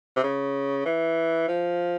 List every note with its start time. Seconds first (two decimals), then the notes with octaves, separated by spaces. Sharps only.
0.16 C3
0.23 C#3
0.85 E3
1.48 F3